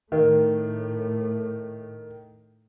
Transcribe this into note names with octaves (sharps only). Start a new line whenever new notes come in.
A2 D#3 A3